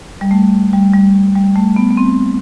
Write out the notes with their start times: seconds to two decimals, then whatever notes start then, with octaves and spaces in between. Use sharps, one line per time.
0.21 G3
0.31 A3
0.73 G3
0.94 G3
1.35 G3
1.56 A3
1.76 B3
1.91 B3
1.97 C4